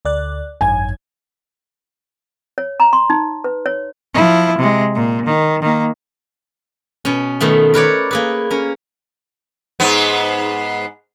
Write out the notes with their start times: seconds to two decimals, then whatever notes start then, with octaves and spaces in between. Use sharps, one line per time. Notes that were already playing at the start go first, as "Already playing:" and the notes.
0.05 D2 D5 F#6
0.61 G#1 F#2 G#5 G#6
2.58 C#5
2.80 A#5
2.93 C6
3.10 D#4
3.44 B4
3.66 C#5
4.14 F3 E4
4.58 C3 G#3
4.95 A#2
5.26 D#3
5.62 D#3 A#3
7.05 B2 C#4
7.40 B2 D#3 A3 B3
7.74 A#4 B4 C#5 D5
8.11 A#3 G#4 B4
8.51 C#4 A#4
9.80 G#2 B3